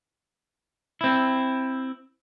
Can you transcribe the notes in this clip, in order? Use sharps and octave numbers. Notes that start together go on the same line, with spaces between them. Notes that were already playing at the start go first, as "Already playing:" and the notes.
C4 E4